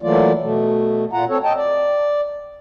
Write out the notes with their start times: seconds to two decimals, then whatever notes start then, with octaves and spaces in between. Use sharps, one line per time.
0.02 E3 F#3 A3 A#3 F4 D5
0.42 B2 A3
1.13 A#2 F4 F#5 A#5
1.29 C4 A4 C#5
1.44 D#5 G5 A5
1.56 D5